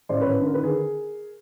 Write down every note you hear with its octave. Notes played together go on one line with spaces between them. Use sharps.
A1 C5 D5
B4 C#5
A1
D3
A#4
D#3 B4
G#4 A#4